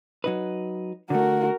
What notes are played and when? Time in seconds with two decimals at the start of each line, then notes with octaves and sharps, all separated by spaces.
0.24 F#3 D#4 B4
1.10 D3 A3 F#4 A#4